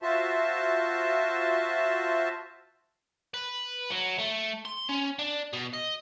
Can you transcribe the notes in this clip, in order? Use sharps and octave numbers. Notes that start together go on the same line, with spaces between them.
F4 F#4 C5 E5 A5
B4
F#3
A3
C6
C#4
D4
B2
D#5